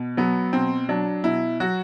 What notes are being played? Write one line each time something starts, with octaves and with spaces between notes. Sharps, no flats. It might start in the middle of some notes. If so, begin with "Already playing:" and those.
Already playing: B2
F#3 B3
B2 C4
F#3 D4
B2 E4
F#3 F#4